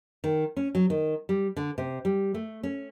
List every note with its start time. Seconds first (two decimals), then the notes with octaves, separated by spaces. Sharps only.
0.24 D#3
0.57 C#4
0.75 F#3
0.90 D#3
1.29 G3
1.56 D3
1.78 C3
2.05 G3
2.34 A3
2.63 C#4